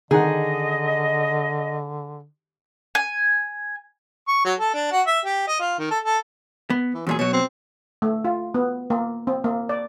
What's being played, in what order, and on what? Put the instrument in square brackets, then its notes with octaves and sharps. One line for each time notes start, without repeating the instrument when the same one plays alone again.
[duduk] D3 [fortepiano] D#3 D#4 F#5 [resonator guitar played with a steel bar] G#4 [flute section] D#5
[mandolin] G#5
[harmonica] C#6
F#3
A4
D4
F#4
E5
G4
D#5
F4
D#3
A4
A4
[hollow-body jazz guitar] B3
[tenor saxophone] E3
[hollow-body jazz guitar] E2 A#2 G#4 [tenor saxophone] F#3
[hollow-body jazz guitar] B2 F#3 [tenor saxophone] C#5
[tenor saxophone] C4
[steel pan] A3
F4
B3
A#3
C4
A#3
D5